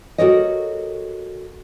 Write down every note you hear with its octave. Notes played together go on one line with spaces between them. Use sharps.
F#4 G4 A4 A#4 C#5 D#5